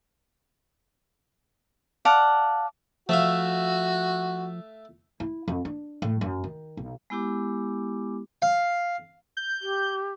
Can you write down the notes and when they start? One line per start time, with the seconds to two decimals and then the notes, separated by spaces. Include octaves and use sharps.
2.05 D5 F5 F#5 A5
3.09 F3 A3 F#4 E5 F5
5.20 E4
5.48 F2
5.65 D4
6.02 A2
6.21 F#2
6.44 D#3
6.77 B1
7.10 G#3 B3 E4 G4 D6
8.42 F5
9.37 G6
9.61 G4